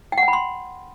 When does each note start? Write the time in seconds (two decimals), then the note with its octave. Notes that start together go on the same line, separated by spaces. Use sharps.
0.12 G5
0.18 F#5
0.23 G5
0.28 B5
0.33 C6